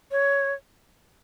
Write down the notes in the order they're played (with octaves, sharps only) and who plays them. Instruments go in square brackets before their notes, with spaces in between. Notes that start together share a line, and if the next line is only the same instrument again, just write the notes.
[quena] C#5